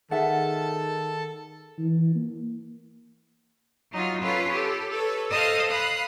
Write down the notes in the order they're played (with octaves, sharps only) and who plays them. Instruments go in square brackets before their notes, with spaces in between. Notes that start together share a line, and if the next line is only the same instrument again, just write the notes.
[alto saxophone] D#3 [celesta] G#4 [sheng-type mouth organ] A4 A5 [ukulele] E5 F#5
[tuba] E3
A#3
[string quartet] F#3 D#4 F4 F#4
C#4 F4 A4 B4 C#5
G4 A4
A4 B4 C#5
A4 C5 D#5 F5 D#6 F6
F5 B5 D#6 F#6